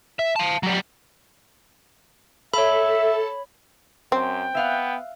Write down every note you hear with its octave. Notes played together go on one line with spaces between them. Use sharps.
E5
F5 A5
F#3 G3
A4 C#5 E5 B5
F#2 C4 G5
B3 E5 F5 F#6